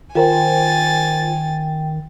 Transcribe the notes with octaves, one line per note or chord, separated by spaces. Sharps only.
D#3 F4 A#4 C5 G5 G#5 A6